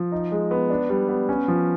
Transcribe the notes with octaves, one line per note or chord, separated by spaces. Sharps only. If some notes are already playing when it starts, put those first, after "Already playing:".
Already playing: F3
D#4
G#3
B3
D4
G3
B3
C#4
F3